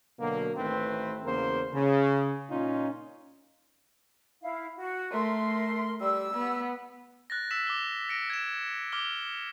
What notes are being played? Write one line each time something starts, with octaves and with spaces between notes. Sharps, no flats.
B2 D3 F#3 A#3
A1 D#3 A3 C4 B4
E2 C#3 A#3 A#4 C5
C#3
A#2 C#4 D#4 F4
E4 F5
F#4
A3 A#4 C6
G3 E6
B3
F#6 A6 A#6
E6 B6 E7
D6 G7
A#6 C#7 D7
G#6 E7
D6 F6 G7